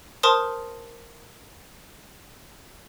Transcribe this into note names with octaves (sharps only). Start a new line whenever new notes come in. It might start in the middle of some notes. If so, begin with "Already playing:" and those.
A#4 C5 A5 C6 D#6